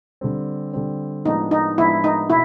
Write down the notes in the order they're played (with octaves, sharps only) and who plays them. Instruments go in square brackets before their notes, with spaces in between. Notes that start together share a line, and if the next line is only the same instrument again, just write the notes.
[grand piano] D3 G3 C4
D3 G3 C4
[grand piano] A2 F3 G#3 B3 D4 [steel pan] D#4
[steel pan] D#4
[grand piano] A2 F3 G#3 B3 D4 [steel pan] E4
[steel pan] D#4
[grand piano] B2 [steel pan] E4